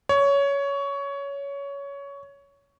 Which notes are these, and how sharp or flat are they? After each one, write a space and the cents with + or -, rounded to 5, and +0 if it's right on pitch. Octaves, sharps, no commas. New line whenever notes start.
C#5 +15